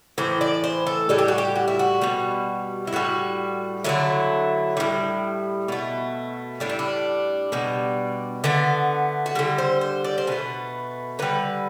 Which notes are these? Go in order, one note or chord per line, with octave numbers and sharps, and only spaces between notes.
A2 E3 C5
D5
C5
A4
A2 G3 A4
G4
F#4
G4
F#4
E4
F#4
B2 G3
E4
A2 G3 F#4
D3 F#3 A3 E4
A2 G3
B2 A3
A2 G3 D4
E4
D4
B2 G3
D3 A3 B3
F#4
D3 G3 E4
C5
C5
D5
C5
B2 A3 B4
D3 G3 B4